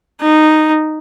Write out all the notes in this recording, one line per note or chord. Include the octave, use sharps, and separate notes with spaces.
D#4